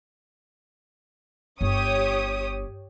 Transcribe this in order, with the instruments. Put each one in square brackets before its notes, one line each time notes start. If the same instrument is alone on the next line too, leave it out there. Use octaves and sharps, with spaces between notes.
[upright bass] G1 [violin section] G4 C#5 D#6